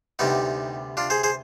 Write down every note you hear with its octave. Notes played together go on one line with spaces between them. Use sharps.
D2 C3 G3 B3 D#4
D4 F4
G#4 C5
G#4 C5